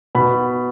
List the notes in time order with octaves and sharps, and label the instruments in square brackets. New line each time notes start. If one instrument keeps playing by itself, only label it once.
[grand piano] B2 B5